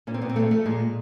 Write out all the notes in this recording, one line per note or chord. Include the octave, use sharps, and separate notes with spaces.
A#2 C#4
C4
A#2 B3
C4
G#3 A3
F3 A3
A#2 G#3
A#2